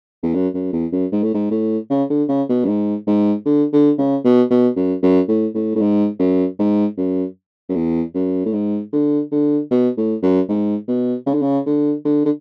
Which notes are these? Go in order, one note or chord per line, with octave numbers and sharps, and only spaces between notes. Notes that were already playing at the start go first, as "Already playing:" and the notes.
E2
F#2
F#2
E2
F#2
G#2
A2
G#2
A2
C#3
D3
C#3
B2
F#2
G#2
G#2
D3
D3
C#3
B2
B2
F#2
F#2
A2
A2
A2
G#2
F#2
G#2
F#2
F#2
E2
F#2
A2
G#2
D3
D3
B2
A2
F#2
G#2
B2
C#3
D3
C#3
D3
D3
D3